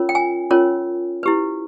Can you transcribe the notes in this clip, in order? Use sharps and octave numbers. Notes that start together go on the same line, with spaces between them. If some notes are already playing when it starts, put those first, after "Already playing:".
Already playing: C#4 F4 A#4 C#5
G5
G#5
C#4 F4 A#4 C#5
E4 G4 B4